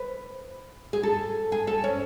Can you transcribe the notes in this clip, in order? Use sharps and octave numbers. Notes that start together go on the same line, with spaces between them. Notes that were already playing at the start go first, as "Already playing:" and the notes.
Already playing: B4
G#4
A4
G#4
A4
C#4